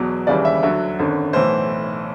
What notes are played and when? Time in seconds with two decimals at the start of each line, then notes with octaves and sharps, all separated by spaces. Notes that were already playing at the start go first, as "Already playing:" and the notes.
Already playing: E2 B2 F#3
0.27 D#2 C#3 E3 G3 D5
0.45 E5
0.63 D2 D3 F#3 E5
0.99 G#1 F#2 D3
1.33 B1 A2 E3 C5